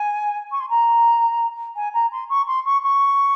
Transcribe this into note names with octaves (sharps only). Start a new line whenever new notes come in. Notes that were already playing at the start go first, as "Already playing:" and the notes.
Already playing: G#5
C#6
C6
A#5
G#5
A#5
C6
C#6
C6
C#6
C#6